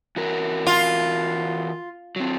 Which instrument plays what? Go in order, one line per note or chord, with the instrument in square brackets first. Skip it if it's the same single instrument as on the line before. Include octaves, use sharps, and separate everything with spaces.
[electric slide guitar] E3 F#4 A#4
[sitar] F4
[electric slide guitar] F#3 C4